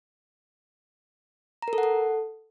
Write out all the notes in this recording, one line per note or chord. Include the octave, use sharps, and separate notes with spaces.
A#5
A#4
A4
F#5
A4